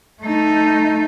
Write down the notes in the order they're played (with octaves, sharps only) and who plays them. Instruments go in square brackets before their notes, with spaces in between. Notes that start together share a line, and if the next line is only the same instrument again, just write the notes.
[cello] A3 D#4